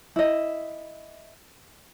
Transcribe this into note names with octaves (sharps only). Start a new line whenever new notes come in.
E4 D#5